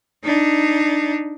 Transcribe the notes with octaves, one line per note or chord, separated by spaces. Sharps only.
D4 D#4